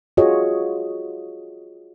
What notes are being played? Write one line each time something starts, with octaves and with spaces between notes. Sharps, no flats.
F4 F#4 G#4 C#5 D#5